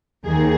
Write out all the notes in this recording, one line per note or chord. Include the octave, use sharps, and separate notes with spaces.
D#2 D#3 G#4